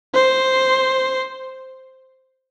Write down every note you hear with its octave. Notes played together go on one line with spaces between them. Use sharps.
C5